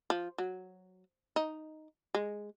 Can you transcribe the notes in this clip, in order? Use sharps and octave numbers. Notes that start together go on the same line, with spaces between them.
F3
F#3
D#4
G#3